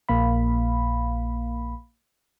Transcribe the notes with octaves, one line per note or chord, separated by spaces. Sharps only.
A#1 A#3 F5 B5